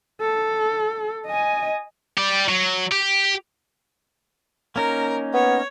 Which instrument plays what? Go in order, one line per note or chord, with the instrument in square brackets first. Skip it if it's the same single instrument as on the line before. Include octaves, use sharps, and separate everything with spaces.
[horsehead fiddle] A4
D#5 G#5
[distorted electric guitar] G4 D5
F#3
G4
[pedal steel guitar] A#3 C#4 D#4 [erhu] A#4
[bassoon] B3 [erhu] C#5